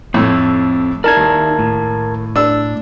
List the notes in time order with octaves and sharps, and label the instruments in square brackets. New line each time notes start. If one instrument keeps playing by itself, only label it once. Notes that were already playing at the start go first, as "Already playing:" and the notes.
[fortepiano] F2 A2 [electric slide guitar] C4
[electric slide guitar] D#4 E4 D5 [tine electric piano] A#4 A5 G#6
[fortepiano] D#2
[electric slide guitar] A2
[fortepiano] D4 E6